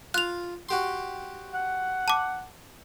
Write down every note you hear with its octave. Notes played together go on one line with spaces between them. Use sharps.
F4 F#6 F7
F#4 G4 C6
F#5
A5 D6